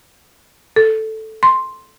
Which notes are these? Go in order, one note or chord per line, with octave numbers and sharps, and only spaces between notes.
A4
C6